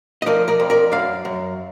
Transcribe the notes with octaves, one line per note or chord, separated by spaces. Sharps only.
D#5
F3 A#4 D5
A#4 D5
F2
A#4 D5
F#2 D5 F5
F#2